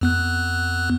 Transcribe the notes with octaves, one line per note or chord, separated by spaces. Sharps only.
F2 B3 F#6